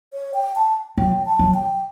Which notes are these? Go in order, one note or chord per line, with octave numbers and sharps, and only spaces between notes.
C#5
G5
A5
F#3 G5
A5
F#3
G5